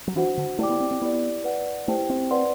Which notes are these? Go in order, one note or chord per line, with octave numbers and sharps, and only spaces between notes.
F#3
E3 D4 F#4 C5 F#5
D3
A3 E4 G4 D5 G5 D6
B3
C4
C4
B3 E4 G4 D5
B4 D5 F#5
A3 E4 G4 C5 G5
C4
B4 D5 F#5 C6